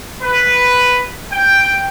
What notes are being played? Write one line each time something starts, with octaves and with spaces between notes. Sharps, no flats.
B4
G5